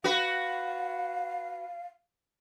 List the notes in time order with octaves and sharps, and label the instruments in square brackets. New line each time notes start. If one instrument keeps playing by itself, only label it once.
[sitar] F#4 B4 [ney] F5